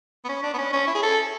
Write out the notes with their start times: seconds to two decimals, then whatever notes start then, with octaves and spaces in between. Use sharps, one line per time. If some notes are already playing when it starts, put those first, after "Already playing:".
0.25 B3
0.29 C#4
0.43 D4
0.54 B3
0.58 C#4
0.73 C#4
0.87 E4
0.95 G#4
1.03 A4